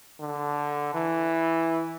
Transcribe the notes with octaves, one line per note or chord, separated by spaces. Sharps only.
D3
E3